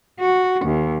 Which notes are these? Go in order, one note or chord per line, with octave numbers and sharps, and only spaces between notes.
F#4
D#2